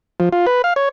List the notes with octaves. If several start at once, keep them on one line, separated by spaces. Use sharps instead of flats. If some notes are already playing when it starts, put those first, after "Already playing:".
F3
F4
B4
F5
C#5